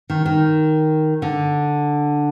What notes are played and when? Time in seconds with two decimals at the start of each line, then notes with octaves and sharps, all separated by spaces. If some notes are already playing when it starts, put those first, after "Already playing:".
0.10 D#3
0.26 D#3
1.22 D3